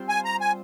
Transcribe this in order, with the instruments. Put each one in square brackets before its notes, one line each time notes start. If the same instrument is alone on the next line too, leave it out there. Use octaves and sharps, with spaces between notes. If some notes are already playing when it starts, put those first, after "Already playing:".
Already playing: [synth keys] G3 C4 F4 C5
[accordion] G#5
A#5
G#5